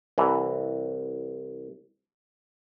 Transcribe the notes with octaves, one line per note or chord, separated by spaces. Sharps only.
C2 E3